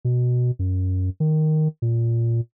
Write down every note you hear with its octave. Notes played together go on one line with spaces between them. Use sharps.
B2
F#2
D#3
A#2